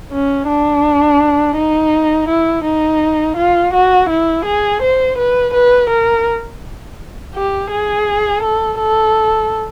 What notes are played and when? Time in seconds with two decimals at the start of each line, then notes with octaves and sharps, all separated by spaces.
0.12 C#4
0.48 D4
1.57 D#4
2.29 E4
2.65 D#4
3.37 F4
3.74 F#4
4.10 E4
4.46 G#4
4.83 C5
5.18 B4
5.54 B4
5.90 A#4
7.35 G4
7.72 G#4
8.43 A4
8.79 A4